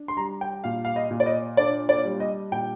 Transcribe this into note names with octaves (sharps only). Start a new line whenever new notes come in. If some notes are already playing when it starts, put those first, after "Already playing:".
Already playing: D4
C6
G3 A#5
G5
A#2 F5
F5
D#5
A#2
D5
D#5
D4 D5
D5
G3
D#5
A#2 G5